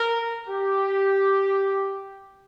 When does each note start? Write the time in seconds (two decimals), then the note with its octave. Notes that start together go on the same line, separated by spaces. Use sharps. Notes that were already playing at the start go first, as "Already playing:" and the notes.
Already playing: A#4
0.48 G4